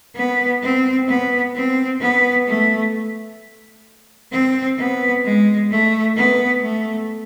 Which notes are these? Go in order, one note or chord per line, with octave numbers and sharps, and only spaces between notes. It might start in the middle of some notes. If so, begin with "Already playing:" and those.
B3
C4
B3
C4
B3
A3
C4
B3
G#3
A3
B3
A3